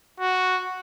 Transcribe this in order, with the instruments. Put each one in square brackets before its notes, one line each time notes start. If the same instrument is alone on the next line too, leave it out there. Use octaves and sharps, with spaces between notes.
[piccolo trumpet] F#4